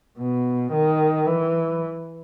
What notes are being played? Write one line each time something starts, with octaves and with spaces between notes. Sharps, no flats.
B2
D#3
E3